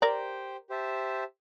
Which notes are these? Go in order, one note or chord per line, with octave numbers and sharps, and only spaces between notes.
G4 A#4 C5 D5 G5
G4 C5 E5 A5